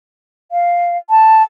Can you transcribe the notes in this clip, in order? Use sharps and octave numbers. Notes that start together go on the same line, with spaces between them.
F5
A5